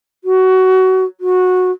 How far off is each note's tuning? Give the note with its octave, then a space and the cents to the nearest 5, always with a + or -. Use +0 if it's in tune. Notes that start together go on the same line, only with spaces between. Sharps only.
F#4 +20
F#4 -15